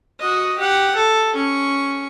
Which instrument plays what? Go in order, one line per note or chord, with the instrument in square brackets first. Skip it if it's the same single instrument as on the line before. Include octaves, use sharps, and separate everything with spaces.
[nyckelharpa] F#4 D#5
G4 F#5
A4
C#4 C#6